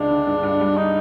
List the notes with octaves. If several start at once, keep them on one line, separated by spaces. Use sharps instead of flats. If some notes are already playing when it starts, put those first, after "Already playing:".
Already playing: C#2 D4
D3
G2
G2
G3
D#4